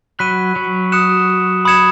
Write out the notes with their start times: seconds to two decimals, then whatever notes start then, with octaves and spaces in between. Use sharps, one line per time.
0.19 F#3 B5 F#6 B6 D#7
0.56 F#3
0.92 D#6 F#6 C#7 E7
1.65 B5 D#6 G#6 C#7 E7